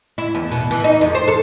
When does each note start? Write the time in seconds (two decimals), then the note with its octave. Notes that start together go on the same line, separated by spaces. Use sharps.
0.18 E4
0.35 E2
0.51 B2
0.71 E3
0.84 D#4
1.01 F2
1.15 C5
1.28 A4